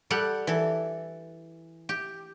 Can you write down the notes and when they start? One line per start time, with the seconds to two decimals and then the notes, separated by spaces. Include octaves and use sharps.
0.10 G3 G4 A4 F#5
0.47 E3 A4
1.89 G4